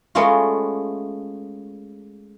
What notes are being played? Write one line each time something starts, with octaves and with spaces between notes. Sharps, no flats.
G#3 A3 B3 C#4 F4 F#4